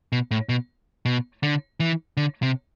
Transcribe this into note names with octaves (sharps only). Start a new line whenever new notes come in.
B2
A2
B2
B2
D3
E3
D3
C3